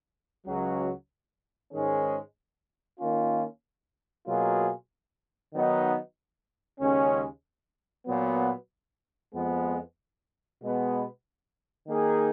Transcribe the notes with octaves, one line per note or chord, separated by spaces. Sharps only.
C#2 C#3 F#3
G#2 D#3 G#3 C#4 G#4
D#3 A#3 C#4 F4
B2 F#3 A#3 F4 G#4
D#3 F#3 B3 D#4
D#2 C#3 G#3 C#4
A#2 F#3 B3
F2 F3 G#3 B3
B2 G#3 B3
D#3 A#3 D#4 G#4